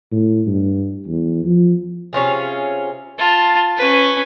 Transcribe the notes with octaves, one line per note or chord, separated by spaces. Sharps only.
A2
G2
E2
F3
C3 C#4 F4 G#4
F4 A5
C#4 B4